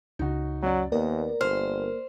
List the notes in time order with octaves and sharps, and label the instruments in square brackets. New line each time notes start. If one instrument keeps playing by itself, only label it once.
[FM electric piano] C#2 C#3 [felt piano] D#4 F#4
[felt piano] F#2 D5 [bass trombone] F#3
[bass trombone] D#2 [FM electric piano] A#3 A#4 D5 [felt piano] B3
[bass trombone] G1 [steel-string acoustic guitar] C5 [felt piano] F6